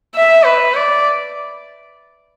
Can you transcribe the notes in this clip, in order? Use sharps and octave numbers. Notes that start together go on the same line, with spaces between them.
E5
B4
D5